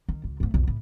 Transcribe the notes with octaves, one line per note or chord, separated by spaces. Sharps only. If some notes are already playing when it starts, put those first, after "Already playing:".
D#3
C#2
G#2 A3
B1 F2
A2